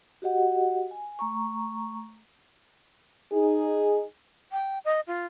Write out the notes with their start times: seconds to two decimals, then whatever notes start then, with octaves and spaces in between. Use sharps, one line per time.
0.22 F#4 G4 D#5 F#5
0.91 G#5
1.19 A3 A#5 C#6
3.32 D#4 G#4
4.52 G5
4.85 D#5
5.07 F4